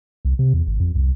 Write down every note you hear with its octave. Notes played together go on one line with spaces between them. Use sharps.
C2
C3
E2
G#1
F2
C2